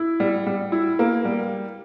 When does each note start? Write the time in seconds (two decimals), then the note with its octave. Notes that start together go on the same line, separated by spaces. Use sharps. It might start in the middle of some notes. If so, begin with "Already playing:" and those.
Already playing: E4
0.20 G3
0.47 G3
0.72 E4
0.99 A#3
1.25 G3